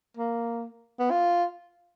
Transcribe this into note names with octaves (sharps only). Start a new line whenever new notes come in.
A#3
B3
F4